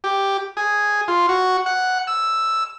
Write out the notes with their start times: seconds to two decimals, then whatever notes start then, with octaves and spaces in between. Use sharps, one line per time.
0.04 G4
0.57 G#4
1.08 F4
1.29 F#4
1.66 F#5
2.07 E6